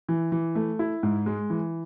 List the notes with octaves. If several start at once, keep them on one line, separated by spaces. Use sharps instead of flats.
E3
E3
A3
E4
G#2
G#3
E3